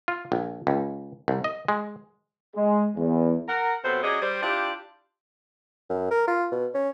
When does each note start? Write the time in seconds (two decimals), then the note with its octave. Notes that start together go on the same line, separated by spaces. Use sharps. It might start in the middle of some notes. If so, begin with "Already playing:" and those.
0.08 F4
0.32 A#1
0.67 C#2
1.28 C2
1.44 D#5
1.68 G#3
2.56 G#3
2.96 E2
3.48 A#4 F#5
3.84 C3 F#3 B3 F#4 A4 C5
4.03 F#3 C#4 G4 G#4 D5 D#5
4.22 G3 C5
4.43 D4 E4 F4 G4
5.90 F#2
6.11 A#4
6.27 F4
6.52 B2
6.74 C#4